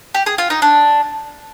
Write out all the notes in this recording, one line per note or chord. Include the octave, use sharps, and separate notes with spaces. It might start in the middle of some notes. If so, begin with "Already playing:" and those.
G4
G#4
F4
D#4
D4